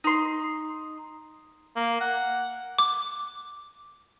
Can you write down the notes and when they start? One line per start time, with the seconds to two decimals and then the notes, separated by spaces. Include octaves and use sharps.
0.04 D#4 C6
1.76 A#3
2.01 F#5
2.79 D6